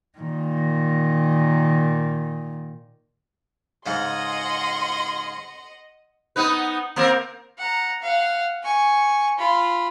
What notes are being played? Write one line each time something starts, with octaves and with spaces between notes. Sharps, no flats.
A#2 D#3
G#2 C#3 D#5 F#5 C6
B3 D#4 B4
A#3 C4 A#4
F#5 A#5
F5 F#5
G#5 C#6
F4 B5